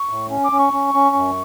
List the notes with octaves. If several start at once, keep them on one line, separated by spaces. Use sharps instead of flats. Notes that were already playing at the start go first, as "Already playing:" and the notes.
Already playing: C#6
A2
C#4
D6
C#4
C#6
C#4
C#4
F#2